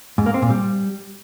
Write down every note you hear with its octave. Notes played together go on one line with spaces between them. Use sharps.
G#2
A#3
C4
A#2
G3